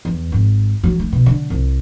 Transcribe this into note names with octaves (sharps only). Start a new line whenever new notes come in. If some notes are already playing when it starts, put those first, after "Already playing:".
E2
G#1
F#3
A3
B2
D3
C2